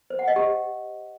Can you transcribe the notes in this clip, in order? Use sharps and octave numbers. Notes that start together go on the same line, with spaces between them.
C5
F#5
D#5
G4